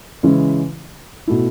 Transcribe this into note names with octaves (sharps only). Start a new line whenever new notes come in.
C#3 E3 G#3 C#4 E4
B2 A3 E4